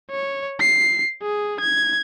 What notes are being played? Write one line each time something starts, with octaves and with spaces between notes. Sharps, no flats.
C#5
C7
G#4
G#6